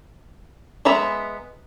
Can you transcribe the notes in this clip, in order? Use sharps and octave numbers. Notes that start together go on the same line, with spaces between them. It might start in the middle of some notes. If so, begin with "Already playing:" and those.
G#3 B3 E5 A#5 B5